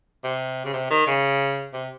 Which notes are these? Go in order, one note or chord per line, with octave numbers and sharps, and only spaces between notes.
C3
C#3
C3
D#3
C#3
C3